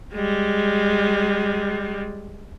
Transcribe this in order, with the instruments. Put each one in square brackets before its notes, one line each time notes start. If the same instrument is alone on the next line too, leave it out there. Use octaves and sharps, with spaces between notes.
[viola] G3 G#3